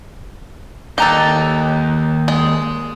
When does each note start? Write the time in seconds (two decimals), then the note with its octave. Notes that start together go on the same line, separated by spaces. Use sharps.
0.98 D#2 G4 A4 D#5 A#5 D#6
2.28 G#3